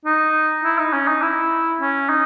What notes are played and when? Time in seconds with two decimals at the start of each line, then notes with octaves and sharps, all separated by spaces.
0.05 D#4
0.64 E4
0.78 D#4
0.93 C#4
1.08 D#4
1.22 E4
1.80 C#4
2.09 D#4